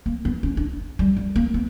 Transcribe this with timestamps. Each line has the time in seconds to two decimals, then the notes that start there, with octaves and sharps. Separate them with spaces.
0.06 A#3
0.25 B3
0.43 C#4
0.57 D4
0.99 G3
1.16 G3
1.36 A#3
1.54 B3